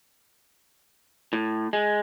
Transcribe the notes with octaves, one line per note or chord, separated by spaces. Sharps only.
A2
G#3